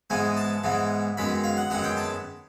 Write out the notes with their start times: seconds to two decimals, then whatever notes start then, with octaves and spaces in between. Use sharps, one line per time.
0.10 G#2 E3 G#3 B3 G#5
0.37 A5
0.64 G#2 E3 G#3 B3
1.17 F#2 D#3 G#3 B3 B5
1.44 F5
1.57 F#5
1.70 F#2 D#3 G#3 B3 F#5
1.84 G5
1.97 A5